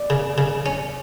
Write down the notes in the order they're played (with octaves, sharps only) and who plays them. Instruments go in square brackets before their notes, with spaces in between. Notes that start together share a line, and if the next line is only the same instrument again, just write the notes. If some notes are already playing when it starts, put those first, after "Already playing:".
Already playing: [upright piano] D5
[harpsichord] C#3
C#3
C#4